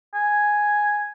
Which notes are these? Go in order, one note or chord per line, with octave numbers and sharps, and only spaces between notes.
G#5